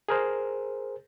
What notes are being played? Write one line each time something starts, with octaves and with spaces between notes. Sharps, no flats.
G#4 A#4 C5